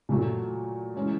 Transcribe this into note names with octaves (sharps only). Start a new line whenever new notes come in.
A#2 F#3 A3
E3 G#3 C#4